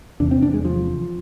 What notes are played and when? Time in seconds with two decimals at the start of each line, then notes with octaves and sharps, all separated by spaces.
0.20 E2 C3 D4
0.31 C4
0.42 D4
0.54 G#3
0.65 F3